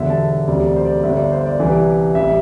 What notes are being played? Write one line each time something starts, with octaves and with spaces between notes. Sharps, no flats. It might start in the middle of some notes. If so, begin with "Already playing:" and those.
Already playing: E1 E2 D3 G3 E5
A5
E1 D2 C3 G3 D5
D5
C5
D5
G1 G2 D3 G3 E5
D5
C5
D5
C2 C3 E3 G3
A1 G3 E5